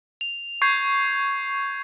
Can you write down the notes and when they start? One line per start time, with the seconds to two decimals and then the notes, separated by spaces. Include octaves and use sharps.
0.21 F7
0.62 C#6 G6 G#6 C7